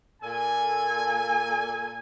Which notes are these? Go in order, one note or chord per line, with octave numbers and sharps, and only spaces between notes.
A#2 A4 G#5